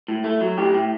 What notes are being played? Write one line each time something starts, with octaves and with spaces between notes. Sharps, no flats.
A2
A3
F#3
A2 G4
A2